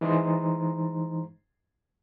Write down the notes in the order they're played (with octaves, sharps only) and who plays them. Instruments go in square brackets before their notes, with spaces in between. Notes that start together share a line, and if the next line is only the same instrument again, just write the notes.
[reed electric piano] E3 G#3 D#4 C5 A#5 C6